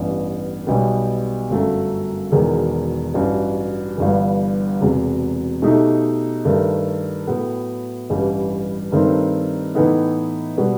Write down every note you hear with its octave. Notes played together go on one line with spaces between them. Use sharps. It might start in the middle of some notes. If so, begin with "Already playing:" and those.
Already playing: A1 G2 E3 B3
B1 B2 G3 B3
G1 F#2 F#3 A3
E1 E2 D#3 F#3
A1 G2 F#3
G1 G2 E3
E1 E2 C3 F#3
B2 A3 D#4 G4
G2 D#3 A3
A2 F#3 B3
A1 G2 E3 G3
G2 D#3 A3 C4 D#4
A2 E3 B3 D#4
B2 G3 B3 F#4